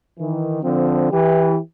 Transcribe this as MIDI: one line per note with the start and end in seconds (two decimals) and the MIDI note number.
0.19 0.58 51
0.19 0.58 52
0.63 1.11 50
0.63 1.11 53
0.63 1.11 60
1.11 1.58 52
1.11 1.58 67